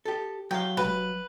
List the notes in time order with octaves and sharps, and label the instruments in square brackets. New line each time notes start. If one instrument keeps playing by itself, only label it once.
[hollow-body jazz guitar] G4 A4
[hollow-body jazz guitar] F#3 F5 [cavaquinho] G5
[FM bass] E1 [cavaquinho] B4